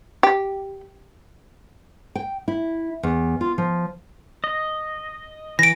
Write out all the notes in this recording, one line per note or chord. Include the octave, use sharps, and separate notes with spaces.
G4
G5
E4
E2
F4
F3
D#5
E3 A#6 D7